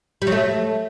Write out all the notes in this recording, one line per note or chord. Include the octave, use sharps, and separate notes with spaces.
G3
F#3
A3